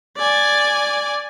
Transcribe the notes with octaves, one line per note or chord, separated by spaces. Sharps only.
D5 G#5